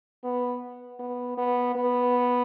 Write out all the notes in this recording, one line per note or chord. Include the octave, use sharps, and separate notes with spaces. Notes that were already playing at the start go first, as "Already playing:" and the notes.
B3
B3
B3
B3